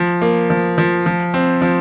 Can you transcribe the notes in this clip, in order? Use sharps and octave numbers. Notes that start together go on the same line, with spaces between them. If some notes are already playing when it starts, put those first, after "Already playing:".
Already playing: F3
A#3
F3
F3
F3
C4
F3